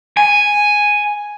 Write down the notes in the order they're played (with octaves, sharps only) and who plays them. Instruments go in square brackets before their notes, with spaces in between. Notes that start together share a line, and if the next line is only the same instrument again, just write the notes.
[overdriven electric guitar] G#5